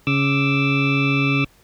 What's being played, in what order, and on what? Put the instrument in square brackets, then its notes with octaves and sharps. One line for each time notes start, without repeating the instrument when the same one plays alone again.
[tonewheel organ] C#3 D6 E6